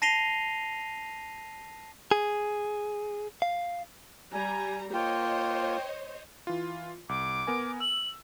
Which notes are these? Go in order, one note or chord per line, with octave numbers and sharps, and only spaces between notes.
A5 A#6 C7 D#7 F7 G7
G#4
F5
G3 G#5 A#5
A#3 F4 C5 C#5 D#5 G5
E3 F4
C2 D6
B3 A#4 G#5
E6 F#7